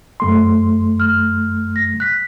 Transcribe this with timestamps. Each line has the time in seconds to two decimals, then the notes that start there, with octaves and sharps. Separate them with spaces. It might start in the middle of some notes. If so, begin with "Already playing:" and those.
0.20 F#2 A3 C6
1.00 F6
1.76 A#6
2.00 F#6 B6